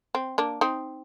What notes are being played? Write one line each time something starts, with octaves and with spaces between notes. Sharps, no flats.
C4
A#3 D4
C4 D#4